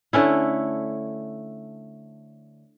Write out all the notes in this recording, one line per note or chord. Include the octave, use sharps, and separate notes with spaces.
D3 A3 C#4 E4